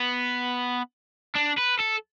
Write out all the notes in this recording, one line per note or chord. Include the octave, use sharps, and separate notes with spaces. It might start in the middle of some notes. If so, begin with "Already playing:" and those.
Already playing: B3
D4
B4
A4